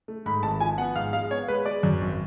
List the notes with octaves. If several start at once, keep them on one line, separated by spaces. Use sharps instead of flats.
A3
G#2 B5
G#1 A5
F3 G#5
B3 F#5
G#2 F5
G#3 F5
B3 C#5
G#3 B4
G#3 D5
F#2
G#1